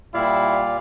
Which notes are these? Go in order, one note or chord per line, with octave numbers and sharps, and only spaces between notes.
A#2 G3 E4 D5 F5